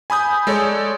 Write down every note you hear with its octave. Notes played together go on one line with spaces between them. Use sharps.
G#5 B5 D#6 G6
G#3 A4 C#5 D5